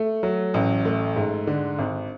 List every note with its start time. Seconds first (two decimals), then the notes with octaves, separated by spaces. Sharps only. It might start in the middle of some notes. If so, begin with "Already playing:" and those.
Already playing: A3
0.23 F#3
0.54 A1
0.85 A3
1.16 G#2
1.47 D3
1.79 G#1